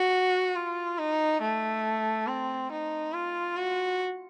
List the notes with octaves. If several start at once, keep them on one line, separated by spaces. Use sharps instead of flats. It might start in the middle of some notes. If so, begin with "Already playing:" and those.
Already playing: F#4
F4
D#4
A3
C4
D#4
F4
F#4